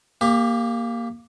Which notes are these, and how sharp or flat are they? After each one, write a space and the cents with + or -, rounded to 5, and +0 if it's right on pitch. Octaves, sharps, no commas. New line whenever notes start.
A#3 +0 G4 +30